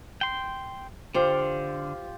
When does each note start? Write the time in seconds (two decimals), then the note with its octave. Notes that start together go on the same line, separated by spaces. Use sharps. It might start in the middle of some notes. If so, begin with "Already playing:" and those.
0.21 G5 C6
1.14 D3 F4 G4 C5 F5